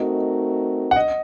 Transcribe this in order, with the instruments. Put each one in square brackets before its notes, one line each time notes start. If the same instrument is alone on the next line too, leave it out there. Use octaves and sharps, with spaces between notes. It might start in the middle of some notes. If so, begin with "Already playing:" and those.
Already playing: [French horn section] A3 C4 D#4 F#4 A#4 [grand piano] D#5
[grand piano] F#5
D#5